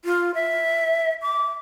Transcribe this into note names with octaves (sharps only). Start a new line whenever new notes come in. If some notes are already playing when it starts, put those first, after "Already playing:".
F4
E5
D6